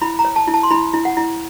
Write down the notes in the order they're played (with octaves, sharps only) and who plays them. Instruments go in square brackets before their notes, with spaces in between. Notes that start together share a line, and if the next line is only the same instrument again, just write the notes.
[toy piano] E4 B5
A#5
C#5
A5
E4
A5
C6
E4 B5
E4
F#5
E4